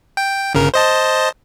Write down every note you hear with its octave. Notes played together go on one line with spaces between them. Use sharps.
G5
G1 C#3 A#4
C5 D#5 A5